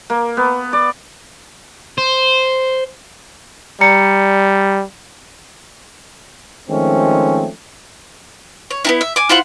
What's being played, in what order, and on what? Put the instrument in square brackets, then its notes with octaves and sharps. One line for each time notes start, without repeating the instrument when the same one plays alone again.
[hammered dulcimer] A#3
B3
D5
[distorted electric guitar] C5
[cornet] G3 [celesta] D5 A#5 C#7
[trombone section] D#3 F3 G#3 A3 C4 C#4
[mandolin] C#5
B3 D#4 E4
E5
G#5 D6
E4 F4 C5 F#5